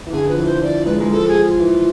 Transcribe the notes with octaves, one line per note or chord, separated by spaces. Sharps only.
E3
D3 G#4
F3 B4
E3
C5
F3 D5
G#3 B4
G#3
F3 A4
G#4
F4
E3